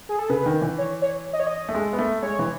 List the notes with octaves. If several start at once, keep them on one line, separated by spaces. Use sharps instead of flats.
G#4
A4
C#3 B4
D#3
E3
C#5
C#5
D#5
C#5
D#5
A3
G#3
B3
A3
G#3 C#5
E3